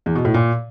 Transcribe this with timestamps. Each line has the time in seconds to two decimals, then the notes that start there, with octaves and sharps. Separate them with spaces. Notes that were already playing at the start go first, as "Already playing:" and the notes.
0.06 E2
0.15 B2
0.25 A2
0.34 A#2